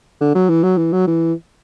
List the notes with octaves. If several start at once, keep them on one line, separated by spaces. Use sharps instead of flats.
D3
F#3
E3
F#3
E3
F#3
E3